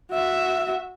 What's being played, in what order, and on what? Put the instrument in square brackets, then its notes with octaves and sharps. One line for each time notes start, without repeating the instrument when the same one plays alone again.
[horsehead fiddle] F#4 E5